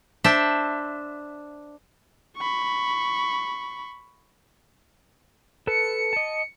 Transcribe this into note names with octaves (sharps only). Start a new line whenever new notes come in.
D4 C5 E5
B5 C#6
A4 B4 A5 C#7
D#5 A5